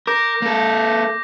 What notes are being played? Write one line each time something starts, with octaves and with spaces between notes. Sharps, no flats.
A#4 D6 G6 A#6
A#3 A4